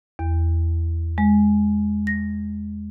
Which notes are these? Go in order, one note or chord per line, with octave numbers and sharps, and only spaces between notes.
E2
G#3
A#6